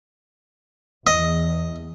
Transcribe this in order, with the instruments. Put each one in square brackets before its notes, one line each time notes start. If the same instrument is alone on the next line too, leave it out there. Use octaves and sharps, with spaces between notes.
[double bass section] E2 [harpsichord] D#5